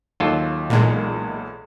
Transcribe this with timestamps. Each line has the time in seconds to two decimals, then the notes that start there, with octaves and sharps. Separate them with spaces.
0.20 D#2 F#3 F4 A4
0.70 B1 E2 A#2 G#3